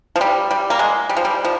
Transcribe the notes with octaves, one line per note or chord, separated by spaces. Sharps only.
F3
G3
G3
A#3
G#3
G3
F3
G3
F3